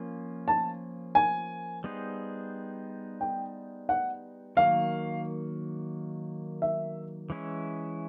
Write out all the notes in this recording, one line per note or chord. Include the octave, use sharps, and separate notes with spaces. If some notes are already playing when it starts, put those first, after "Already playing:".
Already playing: F3 A#3 C#4 F4
A5
G#5
G3 B3 D#4 G#4 C5
G5
F#5
D#3 F#3 A#3 F5
E5
E3 G#3 C#4 E4